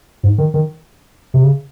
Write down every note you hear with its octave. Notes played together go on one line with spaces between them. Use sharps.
G#2
D#3
D#3
C3
C#3